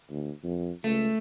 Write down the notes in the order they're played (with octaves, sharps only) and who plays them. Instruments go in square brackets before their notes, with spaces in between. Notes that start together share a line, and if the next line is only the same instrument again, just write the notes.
[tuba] D2
F2
[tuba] C#2 [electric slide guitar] A3